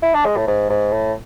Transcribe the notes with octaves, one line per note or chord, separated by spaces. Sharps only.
E4
D4
G#3
A2
G#2
G#2
A2